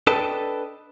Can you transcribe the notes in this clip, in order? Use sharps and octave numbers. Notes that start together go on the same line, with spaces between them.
D4 A4 B4 D#5 G5 A5